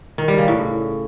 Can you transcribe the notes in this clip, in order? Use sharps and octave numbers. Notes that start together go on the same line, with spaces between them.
D#3
G3
C#3
A2